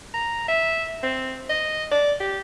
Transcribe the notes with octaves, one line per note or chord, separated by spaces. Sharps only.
A#5
E5
C4
D#5
D5
G4